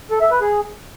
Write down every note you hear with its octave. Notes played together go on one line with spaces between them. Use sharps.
A4
E5
B4
G#4